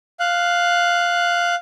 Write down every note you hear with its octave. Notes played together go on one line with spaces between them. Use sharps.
F5 F#6